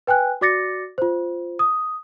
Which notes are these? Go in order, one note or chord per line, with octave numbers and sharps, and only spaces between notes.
B4 G5 G#5 F#6
F#4 D5 D6 A6 A#6 C#7
F4 C5
D#6